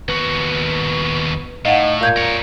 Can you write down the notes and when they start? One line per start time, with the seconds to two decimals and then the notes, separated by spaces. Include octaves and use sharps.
0.08 D#2 B3 F#4
1.65 A2 D#4 F5 F#5
2.01 A#2 F5 G6 G#6
2.16 A#4 C#5